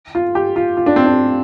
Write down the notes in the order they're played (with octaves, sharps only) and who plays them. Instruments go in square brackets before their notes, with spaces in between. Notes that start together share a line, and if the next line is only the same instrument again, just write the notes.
[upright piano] F4
G4
F4
F4
D4
C4
D4